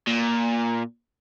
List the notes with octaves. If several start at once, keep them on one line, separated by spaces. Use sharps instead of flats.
A#2